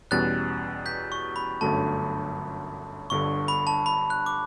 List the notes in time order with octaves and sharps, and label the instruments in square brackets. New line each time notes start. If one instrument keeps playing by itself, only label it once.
[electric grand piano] E2 B2 G3 C#4 [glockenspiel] F#6 A6
[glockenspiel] G6 B6
C#6
B5
[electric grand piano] G1 F#2 D3 F#3 A3 [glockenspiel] A5
[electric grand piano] G1 G2 D3 [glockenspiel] C#6
[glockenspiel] B5
A5
B5
F#6
D6